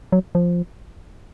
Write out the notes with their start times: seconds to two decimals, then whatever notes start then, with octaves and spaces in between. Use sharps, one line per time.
0.12 F#3
0.35 F3